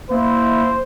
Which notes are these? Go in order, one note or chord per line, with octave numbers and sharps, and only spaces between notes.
A#3 E4 C5